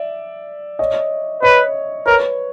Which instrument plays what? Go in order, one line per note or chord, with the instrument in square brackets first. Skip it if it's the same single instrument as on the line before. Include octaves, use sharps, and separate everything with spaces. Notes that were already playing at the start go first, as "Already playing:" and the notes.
Already playing: [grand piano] D5 E5
C#5 D#5
[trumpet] B4 [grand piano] C#5 D#5
[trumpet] A#4 [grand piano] B4 C#5